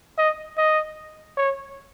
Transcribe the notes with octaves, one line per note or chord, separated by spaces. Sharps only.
D#5
D#5
C#5